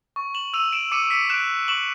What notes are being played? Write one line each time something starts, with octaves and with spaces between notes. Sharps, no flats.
C#6
E7 F#7
E6 D#7 F7
D7 E7
D6 C#7 D#7
B6 C#7
F#6 D7 E7
C#6 E7 F#7